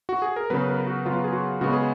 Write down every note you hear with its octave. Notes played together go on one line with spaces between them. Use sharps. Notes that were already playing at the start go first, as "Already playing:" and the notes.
F#4
G#4
A#4
C#3 F#3 B3 B4
A#4
F#4
C#3 F#3 B3 F4
G#4
F#4
C#3 G#3 B3 F#4
G#4